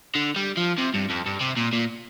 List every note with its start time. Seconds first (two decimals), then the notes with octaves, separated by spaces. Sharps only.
0.15 D3
0.36 G3
0.57 F3
0.78 C3
0.94 G2
1.10 F2
1.26 G2
1.40 C3
1.57 A#2
1.73 A#2